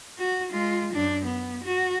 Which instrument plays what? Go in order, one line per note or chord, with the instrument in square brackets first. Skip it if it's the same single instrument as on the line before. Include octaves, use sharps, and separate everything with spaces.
[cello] F#4
G#3 F4
F#2 D4
B3
F#4